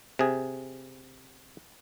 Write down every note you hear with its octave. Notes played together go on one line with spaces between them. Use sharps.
C3 G#4